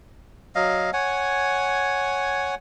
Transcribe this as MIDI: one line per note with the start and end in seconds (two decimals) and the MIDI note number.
0.55 0.90 54
0.55 0.90 75
0.55 0.90 77
0.93 2.55 73
0.93 2.55 78
0.93 2.55 80